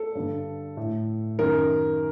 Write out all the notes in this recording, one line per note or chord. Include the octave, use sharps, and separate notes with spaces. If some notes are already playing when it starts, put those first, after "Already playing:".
Already playing: A4
G2 D3
A2
F#2 D#3 A#4